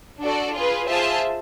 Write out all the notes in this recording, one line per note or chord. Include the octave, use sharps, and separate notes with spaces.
D4 F#4 A4 D5
F4 G#4 B4
F4 G#4 C5 E5 A5